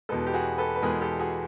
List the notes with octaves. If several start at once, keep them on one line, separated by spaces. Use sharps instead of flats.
E2 B2 G#3 A4 B4
G4
F#4 G#4
A4 B4
B4
E2 B2 G#3 G#4 A#4
G4 A4
F#4 G#4